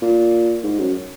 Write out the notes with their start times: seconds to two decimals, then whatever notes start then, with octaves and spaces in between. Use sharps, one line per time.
0.02 A#2
0.64 G#2
0.79 F#2